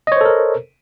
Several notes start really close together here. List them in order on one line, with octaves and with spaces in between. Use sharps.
D#5 C#5 C5 A4 A#4